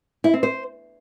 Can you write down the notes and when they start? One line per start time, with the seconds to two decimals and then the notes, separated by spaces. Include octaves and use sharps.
0.24 E4
0.34 C4
0.43 C5